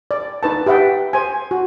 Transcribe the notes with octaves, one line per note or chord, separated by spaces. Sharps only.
D5
D#4 B4 A5
G4 B4 E5 F#5 G5
C5 G#5
F#4